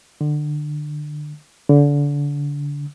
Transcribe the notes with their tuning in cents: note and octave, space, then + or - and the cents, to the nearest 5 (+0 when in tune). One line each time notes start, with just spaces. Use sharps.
D3 +25
D3 -30